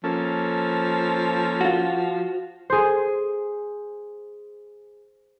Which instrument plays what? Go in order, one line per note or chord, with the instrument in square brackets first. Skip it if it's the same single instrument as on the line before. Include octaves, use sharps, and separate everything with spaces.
[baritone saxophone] F3 [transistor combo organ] A#3 C#4 A4
[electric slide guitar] F4 F#4
[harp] G#4 C5